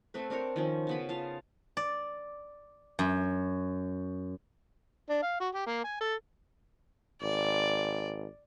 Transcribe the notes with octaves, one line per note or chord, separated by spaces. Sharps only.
A3 C4 B4
C4 D4 A#4 C#5
D#3 F3 C#4
C#3 B3 B5
F4 F5 A5
D5
F#2
D4
F5
F#4
G4
A#3
G#5
A4
G#1 D5